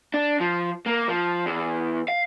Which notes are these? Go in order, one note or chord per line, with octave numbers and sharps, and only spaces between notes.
D4
F3
A#3
F3
E2
F5